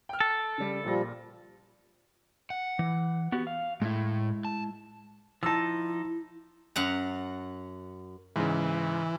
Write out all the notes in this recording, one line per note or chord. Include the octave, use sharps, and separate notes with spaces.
G5 F6
A4
C#3 G3
A#1 A#2 F3 G3 A#6
F#5
E3
B3 F#4 G4
F5
A2 G#3 E4
A5
F3 D#4 E4 A5 E6
F#2 F#5 A#5
G#2 C#3 E3